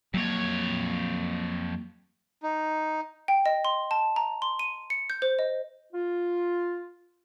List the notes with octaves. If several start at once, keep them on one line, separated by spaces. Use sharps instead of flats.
F2 F#3 A#3 C#5
D#4
G5
D#5
C6
A5
A#5
C6
D#7
C#7
G6
C5
D#5
F4